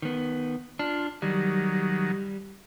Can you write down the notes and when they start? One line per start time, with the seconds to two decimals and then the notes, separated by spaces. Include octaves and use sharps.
0.02 D#3 B3
0.79 D4 F4
1.22 D#3 F#3 G3